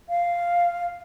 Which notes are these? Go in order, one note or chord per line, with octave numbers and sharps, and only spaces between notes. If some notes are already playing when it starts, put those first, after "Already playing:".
F5